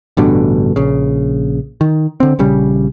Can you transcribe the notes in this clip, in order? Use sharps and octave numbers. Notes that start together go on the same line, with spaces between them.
A1 G2 B2 D3
A#1 C#3
D#3
D3 C4
A#1 C#3 G3